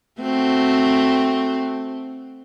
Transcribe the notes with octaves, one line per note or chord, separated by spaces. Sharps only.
A3 C4 F#4